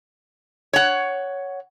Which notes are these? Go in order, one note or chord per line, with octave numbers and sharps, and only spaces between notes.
C#5 F#5